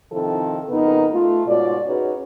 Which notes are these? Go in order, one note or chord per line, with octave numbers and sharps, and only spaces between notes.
C3 D#3 F3 C4 E4 A4
F2 C#3 B3 D#4 A#4 B4
A3 F4
G#2 B2 F4 F#4 C#5 D5
C#4 D#4 F#4 G#4 B4 C#5